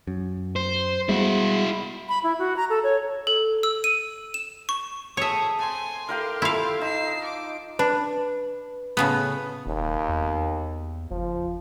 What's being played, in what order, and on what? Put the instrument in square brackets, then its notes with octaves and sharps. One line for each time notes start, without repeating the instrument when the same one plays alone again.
[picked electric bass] F#2
[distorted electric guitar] C5
[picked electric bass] G3 G#3 B3 [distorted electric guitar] E4 F#4
[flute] B5
E4
F#4
A#5
A4
C#5
[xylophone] A4
E6
D#7
E7
C#6
[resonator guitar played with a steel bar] A2 A4 [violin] G#4 D#6 [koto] C#5 E5
[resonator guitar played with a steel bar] A3 C4 [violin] G#5 C6
[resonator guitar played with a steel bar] E4 [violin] G4 C6 [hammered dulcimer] A#4 F5 G5
[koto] E4 F5 [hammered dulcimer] F4 A4 [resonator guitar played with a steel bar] C5
[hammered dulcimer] D#4 [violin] C7 E7
[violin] D6
[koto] D4 [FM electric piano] B4
[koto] A2 C#3 B3
[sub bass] E1 [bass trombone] D#2
[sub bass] E2
[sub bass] F#1 [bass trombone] F3